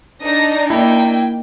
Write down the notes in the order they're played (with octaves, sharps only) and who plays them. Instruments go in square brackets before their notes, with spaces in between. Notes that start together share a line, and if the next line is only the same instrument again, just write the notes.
[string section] D4 D#4 [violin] D#6 A#6
[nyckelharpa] A#3 [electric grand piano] E4 [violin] G5